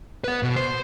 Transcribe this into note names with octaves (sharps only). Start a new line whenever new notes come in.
B4 F#5
B2
C5